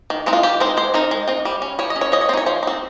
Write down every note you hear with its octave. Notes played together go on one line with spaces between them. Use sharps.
D#3
G#3 C4 D#4
F4
D#3 G4
G#3 C4 D#4 C5
G#3 C5
C4 D#4 A#4
G#3
C4 D#4
G3
C#4
G3 C#5
D#5
C#4
C#5
F3 D#5
C#5
C4 D#4 C5 C#5
F3 C5
C4 D#4